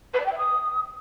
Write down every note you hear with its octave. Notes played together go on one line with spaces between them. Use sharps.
B4
D5
G5
E5
D#6